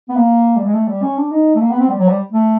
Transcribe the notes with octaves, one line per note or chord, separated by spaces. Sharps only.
B3
A#3
G3
G#3
A3
G3
C#4
D4
D#4
A3
A#3
B3
C4
G3
F#3
G3
A3